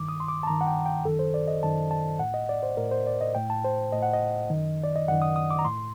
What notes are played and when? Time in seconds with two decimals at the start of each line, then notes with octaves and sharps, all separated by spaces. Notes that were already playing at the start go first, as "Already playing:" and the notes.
Already playing: G2 D#3 D6
0.08 D#6
0.20 C6
0.28 D6
0.43 A5
0.47 G2 D#3 A#5
0.61 F#5
0.67 G5
0.86 G5
1.05 F#2 D#3 A4
1.19 C5
1.34 D5
1.48 D#5
1.63 F#2 D#3 A5
1.91 A5
2.19 A2 F#5
2.34 D#5
2.49 D5
2.63 C5
2.77 A2 A#4
2.91 C5
3.07 D5
3.21 D#5
3.35 A2 G5
3.50 A5
3.64 C5
3.92 A2 D#5
4.02 F#5
4.13 D#5
4.50 F#2 D#3
4.83 D5
4.96 D#5
5.08 F#2 D#3 F#5
5.22 D#6
5.36 D#6
5.51 D6
5.59 A#5
5.65 A2 C6